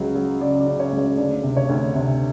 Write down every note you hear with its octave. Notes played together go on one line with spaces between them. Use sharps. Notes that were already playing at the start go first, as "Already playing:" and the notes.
Already playing: C#2 F#3
F#3
C#3 D5
D5
C#3
C#5
C#2
C#5
D2 D5
C3
C#5
D2
C3